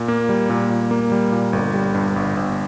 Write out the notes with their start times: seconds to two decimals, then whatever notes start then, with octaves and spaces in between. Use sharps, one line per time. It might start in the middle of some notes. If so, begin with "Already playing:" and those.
Already playing: A#2
0.08 A#3
0.29 G3
0.50 A#2
0.70 A#2
0.91 A#3
1.12 G3
1.32 A#2
1.53 G1
1.74 G3
1.95 G2
2.16 G1
2.37 G1